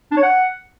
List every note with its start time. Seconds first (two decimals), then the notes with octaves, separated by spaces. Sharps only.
0.11 D4
0.17 C#5
0.23 F#5